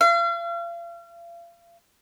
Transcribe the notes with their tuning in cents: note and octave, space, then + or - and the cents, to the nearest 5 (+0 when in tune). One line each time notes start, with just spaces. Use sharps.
F5 -40